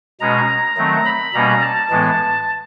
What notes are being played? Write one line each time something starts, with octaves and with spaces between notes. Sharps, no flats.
B2 G#3 C#4 A#5
D#3 F#3 A3 C4
B5
B2 G3 A#3 C#4 A#5
A5
A2 E3 G#3 B3